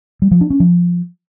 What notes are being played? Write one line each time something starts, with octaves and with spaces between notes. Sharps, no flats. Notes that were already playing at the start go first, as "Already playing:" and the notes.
G3
F3
D4
C#4
F3